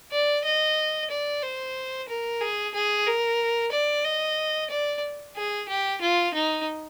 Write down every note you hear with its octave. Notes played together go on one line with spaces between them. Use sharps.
D5
D#5
D5
C5
A#4
G#4
G#4
A#4
D5
D#5
D5
G#4
G4
F4
D#4